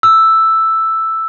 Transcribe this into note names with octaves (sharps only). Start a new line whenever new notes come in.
E6